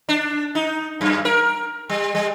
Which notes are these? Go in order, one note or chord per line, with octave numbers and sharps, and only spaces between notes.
D4
D#4
F#2
A#4
G3
G3